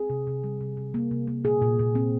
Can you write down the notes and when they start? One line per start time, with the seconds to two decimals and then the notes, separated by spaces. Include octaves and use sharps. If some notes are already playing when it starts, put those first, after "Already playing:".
Already playing: C4 G#4
0.10 C3
0.27 C3
0.44 G3
0.61 C3
0.77 C3
0.94 A#3
1.11 C3
1.27 A#3
1.44 A#2 G#4
1.62 A#2
1.79 A#2
1.95 C4